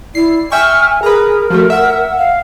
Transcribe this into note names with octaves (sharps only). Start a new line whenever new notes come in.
E4 D5 C7
E5 G5 G#5 C#6 F6
G#4 A#4 B4 A#5
F3 A3 F#4
E5 F#5
F5